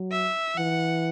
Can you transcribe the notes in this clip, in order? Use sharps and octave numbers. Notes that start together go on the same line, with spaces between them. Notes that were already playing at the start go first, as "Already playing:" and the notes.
Already playing: F#3
E5
E3 F#5